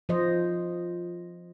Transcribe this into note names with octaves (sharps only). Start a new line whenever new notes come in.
F3 C5 D#5